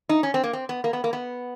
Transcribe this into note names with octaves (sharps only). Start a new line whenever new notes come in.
D#4
C#4
C4
A#3
C4
B3
A#3
B3
A#3
B3